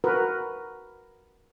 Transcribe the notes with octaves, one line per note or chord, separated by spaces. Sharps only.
F#4 A#4 B4